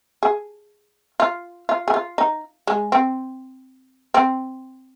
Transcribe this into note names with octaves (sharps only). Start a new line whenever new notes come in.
G#4
F4
F4
G#4
F4
D#4
G#3
C4
C4